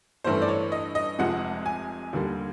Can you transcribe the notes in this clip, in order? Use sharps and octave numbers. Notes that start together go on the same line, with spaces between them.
G2 E3 A3 C#4 C5
D5
C#5
D#5
D#5
F1 F2 C3 F3 G#3 F#5
G#5
D#2 D3 G3 A#3